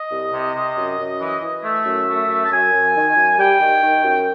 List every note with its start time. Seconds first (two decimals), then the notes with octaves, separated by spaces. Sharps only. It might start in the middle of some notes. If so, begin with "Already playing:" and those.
Already playing: D#5
0.11 C2
0.33 C3
0.55 C3
0.77 F#2
0.99 F#2
1.20 E3
1.43 E3
1.64 A3 E5
1.86 F#2
2.08 A3
2.29 F#2
2.45 A5
2.52 F#2 G#5
2.73 F#2
2.95 D#3
3.16 F#2
3.38 G3 G5
3.60 D#3
3.82 D#3
4.04 F#2